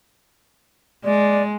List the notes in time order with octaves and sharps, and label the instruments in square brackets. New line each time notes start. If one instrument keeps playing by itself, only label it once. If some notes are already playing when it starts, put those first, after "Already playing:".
[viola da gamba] G#3 [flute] D5